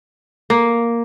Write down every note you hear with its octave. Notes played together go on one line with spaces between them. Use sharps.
A#3